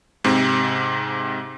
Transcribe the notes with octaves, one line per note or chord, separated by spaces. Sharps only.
G#2 C3 C4